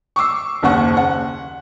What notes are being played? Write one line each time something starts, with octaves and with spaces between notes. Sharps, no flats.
C#6 D6 E6 C7
F#1 D#2 C#3 F#5 C#6 F#6
F#5